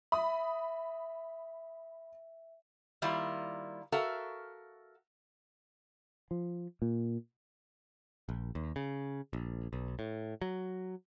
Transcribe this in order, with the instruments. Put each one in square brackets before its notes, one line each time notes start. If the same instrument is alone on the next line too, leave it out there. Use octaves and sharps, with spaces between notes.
[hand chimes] E5 [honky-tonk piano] B5 D#6
[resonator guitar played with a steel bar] D#3 G3 A#3 E4 F4
F#4 A4 A#4 E5 F5
[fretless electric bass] F3
A#2
[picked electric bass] A#1
D#2
C#3
A#1
B1
A2
F#3